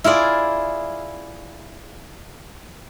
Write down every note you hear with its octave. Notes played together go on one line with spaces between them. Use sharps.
E4 F4 G#4 D5